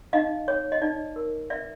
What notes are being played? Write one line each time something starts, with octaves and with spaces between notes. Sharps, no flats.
D#4 D#5 F5
C#5
D#5
D#4 D5
A#4
B4 D5 E5